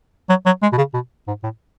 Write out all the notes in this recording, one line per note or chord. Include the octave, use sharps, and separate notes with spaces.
F#3
F#3
G#3
B2
C#3
B2
G#2
A2